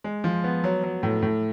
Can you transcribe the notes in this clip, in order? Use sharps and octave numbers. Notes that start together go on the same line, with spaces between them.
G#3
F3
B3
F#3
F#3
A2
A2